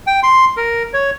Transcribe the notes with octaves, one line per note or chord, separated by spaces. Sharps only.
G5
C6
A#4
C#5